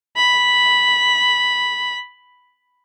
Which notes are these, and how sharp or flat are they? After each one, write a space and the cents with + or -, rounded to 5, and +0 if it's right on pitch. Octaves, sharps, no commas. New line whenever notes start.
B5 -5